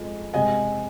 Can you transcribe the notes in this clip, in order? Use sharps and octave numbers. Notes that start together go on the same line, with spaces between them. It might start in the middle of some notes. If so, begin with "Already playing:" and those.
Already playing: F2 F3 G#3
C3 G#3 D#5 G#5